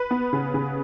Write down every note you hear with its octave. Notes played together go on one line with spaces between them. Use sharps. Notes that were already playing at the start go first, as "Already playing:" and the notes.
Already playing: B4
B3
C#3
C#3